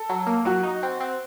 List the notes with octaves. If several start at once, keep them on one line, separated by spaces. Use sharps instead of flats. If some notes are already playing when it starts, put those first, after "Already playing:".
Already playing: A4
F#3
A#3
F#3 F#4
D#4
C4
C4